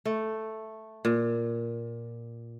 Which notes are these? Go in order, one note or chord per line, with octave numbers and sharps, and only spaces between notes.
A3
A#2